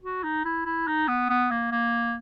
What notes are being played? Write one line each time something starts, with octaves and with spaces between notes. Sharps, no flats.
F#4
D#4
E4
E4
D#4
B3
B3
A#3
A#3